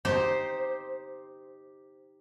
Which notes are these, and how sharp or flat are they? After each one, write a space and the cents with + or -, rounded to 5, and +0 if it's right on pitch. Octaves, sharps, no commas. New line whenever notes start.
D#4 +0 G4 +0 C5 +0